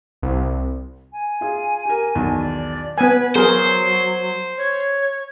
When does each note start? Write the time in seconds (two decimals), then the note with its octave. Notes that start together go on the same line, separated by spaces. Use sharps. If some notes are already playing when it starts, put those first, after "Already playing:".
0.23 C2
1.12 G#5
1.41 F4 G#4
1.85 G4 A#4
2.15 B1 E2 D#3
2.39 D5
2.98 B3 B4 G#5
3.35 F#3 B3 G#4 A#4 C5
4.58 C#5